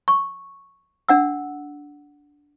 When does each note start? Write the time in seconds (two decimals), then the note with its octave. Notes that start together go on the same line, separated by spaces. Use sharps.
0.08 C#6
1.09 D4 F#5 E6